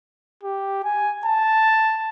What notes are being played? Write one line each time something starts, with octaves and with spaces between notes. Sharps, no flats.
G4
G#5
A5